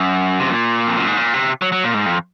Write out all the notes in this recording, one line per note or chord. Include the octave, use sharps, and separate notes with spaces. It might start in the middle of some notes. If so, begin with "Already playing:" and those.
Already playing: F#2
C3
A#2
F2
F#2
G#2
A#2
C3
F#3
F#3
A#2
G#2
F2